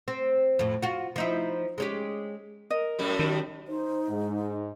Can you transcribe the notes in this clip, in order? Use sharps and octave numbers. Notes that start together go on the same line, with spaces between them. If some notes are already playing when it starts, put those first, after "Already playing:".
C4
F2 A2
F4 F#4
F3 D#4 E4
G#3 C#4 G4
A#4 D#5
F#2 A2 G3
D#3
D#4 C5
G#2